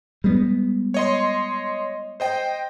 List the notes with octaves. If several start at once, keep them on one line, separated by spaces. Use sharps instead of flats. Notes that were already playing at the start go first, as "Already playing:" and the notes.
G3 G#3 B3
C#5 D#5 C6
C5 D#5 G5